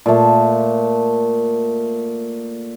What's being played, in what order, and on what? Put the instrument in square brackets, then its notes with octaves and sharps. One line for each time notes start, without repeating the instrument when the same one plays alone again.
[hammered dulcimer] A#2 A3